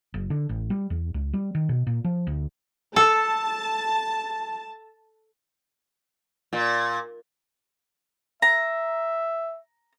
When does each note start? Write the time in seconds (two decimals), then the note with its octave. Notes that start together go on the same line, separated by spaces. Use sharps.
0.14 F#1
0.30 D3
0.49 A1
0.70 G3
0.90 E2
1.14 C#2
1.34 G3
1.55 D#3
1.69 B2
1.87 A#2
2.04 F3
2.27 D2
2.96 A4 A5
6.53 A#2
8.42 E5 A#5